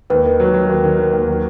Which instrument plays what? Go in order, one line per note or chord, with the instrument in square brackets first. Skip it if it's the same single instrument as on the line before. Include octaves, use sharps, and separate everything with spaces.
[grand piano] D#2 [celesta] B4
[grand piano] D#3
F#3
F#3
D#2
D#3
D#3
D#2
F#3